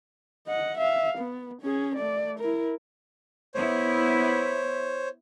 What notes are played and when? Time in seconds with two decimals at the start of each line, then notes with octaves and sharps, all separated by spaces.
0.47 D#5 F#5
0.78 E5 F5
1.18 B3
1.62 C#4 G#4
1.96 A3 D5
2.39 E4 A#4
3.54 B3 E4 C5 C#5